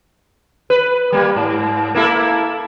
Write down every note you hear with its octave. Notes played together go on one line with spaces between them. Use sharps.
B4
G3 A#3
G#2
A#3 E4 A4